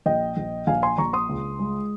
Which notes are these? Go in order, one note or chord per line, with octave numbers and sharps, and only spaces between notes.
A#1 D#5 G5
A#1
A#1 F5 G#5
G#5 C6
A#1 A#5 C#6
C6 D#6
C#2
G#3